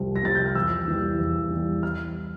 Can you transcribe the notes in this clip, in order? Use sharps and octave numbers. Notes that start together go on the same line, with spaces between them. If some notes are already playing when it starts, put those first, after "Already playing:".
Already playing: C2 C3 F3
A#6
C3 F3 A6
G6
F6
E2 E6
E3 G3
E2
E3 G3
F6